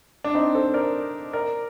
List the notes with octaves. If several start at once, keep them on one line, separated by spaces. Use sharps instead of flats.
D4
C4 D#4
A4 C5
A#4 D5
A#4 D5